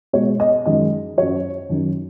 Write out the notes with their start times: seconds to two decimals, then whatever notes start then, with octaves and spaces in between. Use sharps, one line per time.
0.13 B2 G#3 C#5
0.40 D#5
0.66 F#2 D#3 G#3 D#5
1.17 F#2 F#3 C#5
1.69 F#2 D#3 F#3